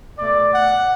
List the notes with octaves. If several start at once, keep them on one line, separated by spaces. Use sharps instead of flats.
B2 A3 D5
F#5